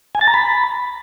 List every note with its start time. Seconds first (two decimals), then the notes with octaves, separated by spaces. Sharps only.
0.15 G#5
0.21 A6
0.28 A#5
0.34 B5